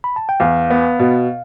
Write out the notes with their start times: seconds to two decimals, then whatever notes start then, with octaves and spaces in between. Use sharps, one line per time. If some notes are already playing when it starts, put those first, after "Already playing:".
0.04 B5
0.16 A5
0.29 G5
0.40 E2 F5
0.70 B3
0.99 B2